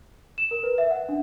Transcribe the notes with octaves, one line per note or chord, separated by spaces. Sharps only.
E7
A#4
B4
E5
F#5
D4